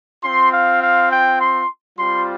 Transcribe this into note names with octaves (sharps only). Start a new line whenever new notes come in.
C4 F4 C6
F5
F5
G5
C6
G3 C4 F4 C6